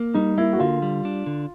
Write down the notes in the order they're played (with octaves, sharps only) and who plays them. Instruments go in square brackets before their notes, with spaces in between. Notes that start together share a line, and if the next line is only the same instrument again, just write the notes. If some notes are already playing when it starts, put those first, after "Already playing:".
Already playing: [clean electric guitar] A#3
[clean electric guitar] G3 [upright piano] D#4
[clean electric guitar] A#3 [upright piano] E4
[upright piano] F#4
[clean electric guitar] D3 [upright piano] F4
[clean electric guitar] G3
D4
D3